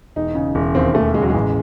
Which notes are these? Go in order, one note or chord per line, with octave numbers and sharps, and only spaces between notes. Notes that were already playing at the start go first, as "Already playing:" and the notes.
E1 D#4
C#3
E1
D#2 C4
E1 A3
C#3 G#3
F#3
G#3
A1